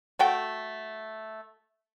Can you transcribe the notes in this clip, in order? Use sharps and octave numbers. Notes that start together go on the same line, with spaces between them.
A3 F#4 G5